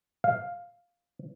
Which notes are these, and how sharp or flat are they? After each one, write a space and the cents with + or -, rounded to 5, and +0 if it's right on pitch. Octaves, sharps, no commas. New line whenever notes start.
F5 +5